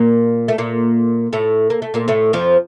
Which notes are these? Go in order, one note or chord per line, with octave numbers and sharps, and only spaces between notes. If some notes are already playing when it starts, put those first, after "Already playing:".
Already playing: A#2 A#3
A3
A#2 A#3
A2 A3
A#3
A3
A#2 A#3
A2 A3
F2 F3